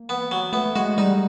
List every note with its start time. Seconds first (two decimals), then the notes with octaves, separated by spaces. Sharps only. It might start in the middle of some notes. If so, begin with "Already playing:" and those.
Already playing: A#3
0.09 B3
0.31 F#3
0.53 A3 B3
0.76 G#3 F#4
0.98 G3 D#4